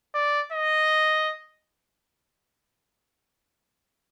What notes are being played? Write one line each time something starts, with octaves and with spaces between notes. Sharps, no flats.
D5
D#5